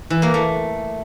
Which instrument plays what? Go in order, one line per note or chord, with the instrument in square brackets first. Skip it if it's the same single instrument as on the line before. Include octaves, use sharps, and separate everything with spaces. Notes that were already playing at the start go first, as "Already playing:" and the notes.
[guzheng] E3
A#3
A3